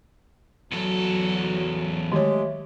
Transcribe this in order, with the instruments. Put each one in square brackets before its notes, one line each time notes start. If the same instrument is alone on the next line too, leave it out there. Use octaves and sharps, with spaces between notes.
[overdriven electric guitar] E2 A4 [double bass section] F#3
[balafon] D#3 C#5 [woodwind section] G#3 A3 G4